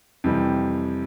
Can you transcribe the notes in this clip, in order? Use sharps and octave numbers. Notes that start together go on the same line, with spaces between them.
F2 C3 E3 G3